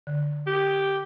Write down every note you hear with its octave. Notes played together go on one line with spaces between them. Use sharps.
D3
G4